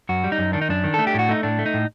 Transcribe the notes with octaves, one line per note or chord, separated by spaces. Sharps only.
F#2 F#4
G3
D#4
F#2
D#3 D4
D#4
F#2 D4
D#3
A3 A4
G4
A2 F#4
A3 D#4
A2 D4
A3
D#4
A2